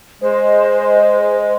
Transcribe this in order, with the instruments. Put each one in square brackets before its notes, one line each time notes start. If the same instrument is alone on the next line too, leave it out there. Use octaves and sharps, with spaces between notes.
[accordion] G#3 [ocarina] C5